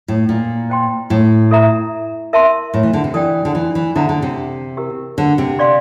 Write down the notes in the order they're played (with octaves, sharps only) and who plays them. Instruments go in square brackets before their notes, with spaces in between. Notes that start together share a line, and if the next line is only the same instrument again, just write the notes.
[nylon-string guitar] A2
A#2
[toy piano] C5 G5 C6
[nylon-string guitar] A2
[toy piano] A4 E5 A#5
A#4 E5 A5 C6
[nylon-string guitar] A2
E3
D3
C3
[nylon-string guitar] E3 [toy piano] A4 D5 G5
[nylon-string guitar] D3
E3
E3
[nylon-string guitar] D3 [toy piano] E4 A4 C5 E5 A#5
[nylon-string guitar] D3
C3
[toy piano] E4 G4 A#4
[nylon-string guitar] D3
C3
[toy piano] G4 D5 F5 C6